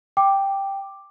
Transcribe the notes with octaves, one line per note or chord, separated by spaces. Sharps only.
G5 D6